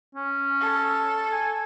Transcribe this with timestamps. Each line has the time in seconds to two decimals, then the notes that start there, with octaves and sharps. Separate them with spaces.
0.15 C#4
0.61 A4
1.32 G#5